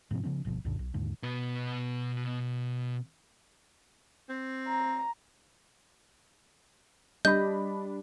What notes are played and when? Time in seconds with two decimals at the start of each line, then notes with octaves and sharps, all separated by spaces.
0.11 G#2 C3 F3 C4
0.23 C#3 F3 B3 C#4
0.45 D1 G1 B2 F3
0.64 C2 F#2 A#2 D3
0.79 B1
0.94 D#2 G#2 D3
1.23 B2 B4
4.29 C4
4.67 A#5
7.25 G3 D4 D#5 B5 G6